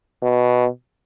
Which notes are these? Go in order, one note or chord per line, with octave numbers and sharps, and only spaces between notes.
B2